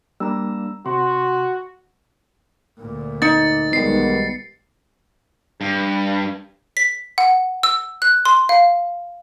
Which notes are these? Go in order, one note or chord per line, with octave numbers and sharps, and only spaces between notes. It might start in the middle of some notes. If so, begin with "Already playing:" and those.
G3 A#3 D4 A#5 E6
C3 F#4 C6
D2 A#2
D#4 A6 C#7
B1 D#3 G3 G#3 B3 C7
G2
B6
F#5
E6
F#6
C6
F5